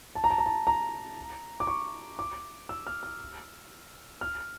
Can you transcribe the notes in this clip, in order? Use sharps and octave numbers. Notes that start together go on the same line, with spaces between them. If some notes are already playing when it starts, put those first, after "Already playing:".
A5
A#5
A5
A#5
A5
A#5
D6
C#6
D6
E6
F6
F6
F6